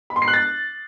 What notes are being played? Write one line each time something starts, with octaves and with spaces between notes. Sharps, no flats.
B5
C6
C7
F#6
A6